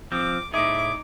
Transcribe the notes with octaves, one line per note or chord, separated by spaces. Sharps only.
F3 C4 D6
A2 D#4 G#4 E5 D6